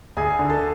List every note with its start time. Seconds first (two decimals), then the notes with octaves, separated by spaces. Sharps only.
0.17 D2 G#4 G#5
0.39 D3
0.50 A4 A5